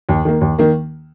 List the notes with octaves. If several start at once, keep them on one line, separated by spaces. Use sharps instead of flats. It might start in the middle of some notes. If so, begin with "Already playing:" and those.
D#2
D#3 A#3
D#2
D#3 A#3